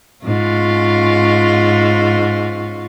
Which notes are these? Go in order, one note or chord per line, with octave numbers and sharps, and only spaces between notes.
G#2 C#4 F4